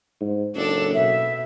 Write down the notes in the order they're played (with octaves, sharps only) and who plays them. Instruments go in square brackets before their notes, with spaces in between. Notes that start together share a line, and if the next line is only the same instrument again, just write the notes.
[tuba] G#2
[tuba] F#1 [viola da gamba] D4 D#4 A4
[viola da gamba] B2 [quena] E5